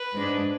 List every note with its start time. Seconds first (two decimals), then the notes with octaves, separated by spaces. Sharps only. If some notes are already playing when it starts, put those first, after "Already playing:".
Already playing: B4
0.14 G#2 G#3 D4